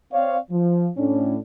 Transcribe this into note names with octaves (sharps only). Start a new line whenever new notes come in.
C4 C#5 D5 F5
F3
A2 C#4 D4